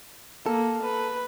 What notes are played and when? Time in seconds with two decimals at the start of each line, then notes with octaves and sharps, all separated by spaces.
0.46 A#3 A4
0.83 B4